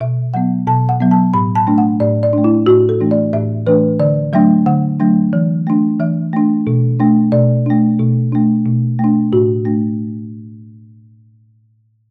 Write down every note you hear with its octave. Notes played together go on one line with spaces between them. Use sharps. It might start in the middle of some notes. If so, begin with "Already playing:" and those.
B2 E5
F#3 B3 F#5
B2 A5
F#5
F#3 B3
A5
A2 B5
A5
A3 D4
F#5
A2 D5
D5
A3 D4
E4
A2 F#4
A4
E3 A3 D4
D5
A2 E5
E3 A3 D4 B4
D3 D5
F#3 A3 D4 E5
D3 F#5
F#3 A3 D4
E3
A3 D4
E3 E5
A3 D4
B2
A3 D4
B2 D5
A3 D4
B2
A3 D4
B2
A3
D4
A2 F#4
A3 D4